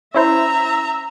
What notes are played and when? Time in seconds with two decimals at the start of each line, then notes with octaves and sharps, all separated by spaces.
0.14 C#4 E4 C5 E5 A#5